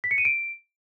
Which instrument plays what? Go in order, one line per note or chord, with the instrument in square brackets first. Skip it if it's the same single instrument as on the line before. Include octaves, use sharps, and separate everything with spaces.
[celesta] B6
C#7
D#7
D7